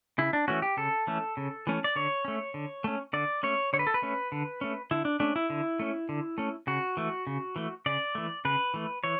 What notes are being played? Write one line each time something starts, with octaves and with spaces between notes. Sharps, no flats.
C#3 E4
D4
E3 A3 C#4 F#4
G4
C#3 A4
E3 A3 C#4
C#3
E3 A3 C#4
D5
D3 C#5
A3 C#4
D3
A3 C#4
D3 D5
A3 C#4 C#5
D3 C#5
B4
A4
B4
A3 C#4
D3
A3 C#4
D3 E4
D4
A3 C#4 D4
E4
D3
A3 C#4
D3
A3 C#4
C#3 F#4
E3 A3
C#3
E3 A3
C#3 D5
E3 A3
C#3 B4
E3 A3
E3 C#5